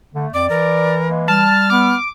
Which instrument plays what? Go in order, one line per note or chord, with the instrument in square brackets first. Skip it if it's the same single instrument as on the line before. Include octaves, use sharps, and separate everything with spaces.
[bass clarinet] D3 [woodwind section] A3
[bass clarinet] F2 [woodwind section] D5 [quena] D6
[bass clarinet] E3 [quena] A#4
[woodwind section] G#3 A#3
[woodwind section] G3 [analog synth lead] A5 [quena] F6
[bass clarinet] B3 [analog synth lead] D6